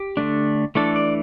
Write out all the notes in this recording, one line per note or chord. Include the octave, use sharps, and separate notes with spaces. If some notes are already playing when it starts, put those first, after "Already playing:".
Already playing: G4
D3 A3 D4
E3 A3 D4 A4
D5